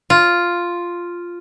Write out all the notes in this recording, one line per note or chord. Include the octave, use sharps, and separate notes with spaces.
F4